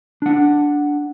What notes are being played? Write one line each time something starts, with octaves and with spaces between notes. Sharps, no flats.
D4 F#5